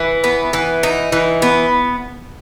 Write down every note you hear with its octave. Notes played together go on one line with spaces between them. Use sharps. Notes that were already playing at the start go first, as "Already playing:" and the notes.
Already playing: E3
B3
E3
D#4
E3
B3